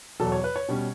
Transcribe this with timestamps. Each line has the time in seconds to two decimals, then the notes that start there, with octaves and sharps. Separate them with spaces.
0.20 E2 B2 F#3 A4
0.32 C#5
0.44 B4
0.56 C#5
0.68 B2 G3 C#4